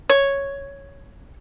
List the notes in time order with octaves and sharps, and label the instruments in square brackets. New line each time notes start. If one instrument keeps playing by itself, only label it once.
[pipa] C#5